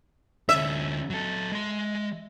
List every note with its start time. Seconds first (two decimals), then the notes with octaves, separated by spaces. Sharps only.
0.49 D2 C#4 E5
1.10 F#3 A4
1.52 G#3 C6